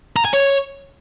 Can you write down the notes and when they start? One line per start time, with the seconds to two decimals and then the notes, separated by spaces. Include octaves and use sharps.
0.16 A#5
0.25 G#5
0.33 C#5